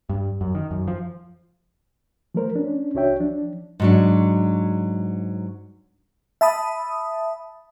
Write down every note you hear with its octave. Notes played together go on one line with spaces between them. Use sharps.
G2
F#2
D#3
F#2
F3
F3 A3 A#4 C5
C#4 D4
C2 D4 F#4 C#5 E5 G5
F3 D4
G#2 F#3 D4
E5 A5 B5 D#6